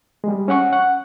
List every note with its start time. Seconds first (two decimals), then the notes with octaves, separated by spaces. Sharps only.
0.24 G3 G#3
0.48 C#4 C#5 F#5 C#6
0.73 F#5